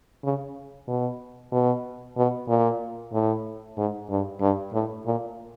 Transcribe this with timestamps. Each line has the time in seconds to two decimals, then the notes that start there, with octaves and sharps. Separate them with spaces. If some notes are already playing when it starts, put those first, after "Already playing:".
0.24 C#3
0.88 B2
1.52 B2
2.17 B2
2.49 A#2
3.13 A2
3.78 G#2
4.10 G2
4.41 G2
4.73 A2
5.06 A#2